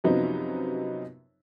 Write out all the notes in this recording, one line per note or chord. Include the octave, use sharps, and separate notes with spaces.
F#2 C3 F3 F#3 B3 D#4